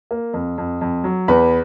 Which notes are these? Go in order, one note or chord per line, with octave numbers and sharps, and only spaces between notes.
A#3
F2
F2
F2
F#3
E2 B4